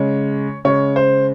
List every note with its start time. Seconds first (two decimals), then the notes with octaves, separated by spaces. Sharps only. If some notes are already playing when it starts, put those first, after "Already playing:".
Already playing: C#3 G#3 C#5
0.65 C#3 G#3 C#5
0.96 C5